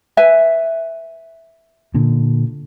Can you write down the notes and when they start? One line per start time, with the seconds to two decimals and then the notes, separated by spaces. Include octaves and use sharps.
0.17 B4 E5 G#5
1.94 A#2 D3